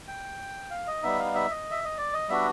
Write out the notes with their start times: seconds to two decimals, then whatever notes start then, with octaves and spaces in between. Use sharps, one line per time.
0.08 G5
0.71 F5
0.87 D#5
1.02 G3 B3 D#4 E5
1.19 F5
1.35 E5
1.51 D#5
1.71 E5
1.84 D#5
1.97 D5
2.14 D#5
2.29 G3 B3 D4 F#4 E5